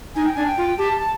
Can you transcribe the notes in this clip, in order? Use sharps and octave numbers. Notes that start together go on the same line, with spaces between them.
D#4 G#5
G5
D4 G#5
G5
F4
G4 A5
A5